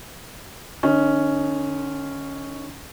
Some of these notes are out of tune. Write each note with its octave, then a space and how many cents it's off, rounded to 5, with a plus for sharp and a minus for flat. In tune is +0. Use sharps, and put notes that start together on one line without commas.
D#3 -45 C#4 +0 D#5 +20